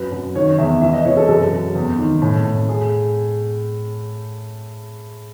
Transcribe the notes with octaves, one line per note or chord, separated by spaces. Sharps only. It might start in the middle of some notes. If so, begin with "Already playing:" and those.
Already playing: F#2 B4
F#2
D#3 C#5
E2 E5
E3 E5
D#5
E3 C#5
A4
F#2 A4
F#2
E2
D#3
A2
A2
G#4